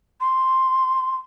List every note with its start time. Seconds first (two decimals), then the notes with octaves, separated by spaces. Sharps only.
0.21 C6